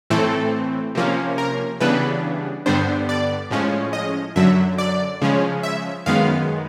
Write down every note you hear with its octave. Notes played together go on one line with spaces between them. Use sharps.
A2 E3 A3 C4 A4
C3 F3 A#3 C#4
A#4
C#3 E3 G3 B3 D4 B4
G2 D3 G3 B3 D4 C5
D5
A2 F3 G#3 C#4
D#5
F#2 D3 F#3 E5
D5
C#3 F3 G#3 C#4
E5
F#2 D#3 G#3 B3 F5